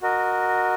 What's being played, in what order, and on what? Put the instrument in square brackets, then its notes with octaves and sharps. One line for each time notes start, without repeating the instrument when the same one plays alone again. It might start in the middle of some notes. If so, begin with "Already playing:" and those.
[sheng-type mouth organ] F#4 A#4 D#5